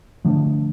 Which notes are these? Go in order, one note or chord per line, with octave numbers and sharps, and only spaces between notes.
D3 F3 A3 D4